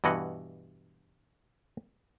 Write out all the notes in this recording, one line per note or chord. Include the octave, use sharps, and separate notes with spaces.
G2 B2 E3 D#5 F#5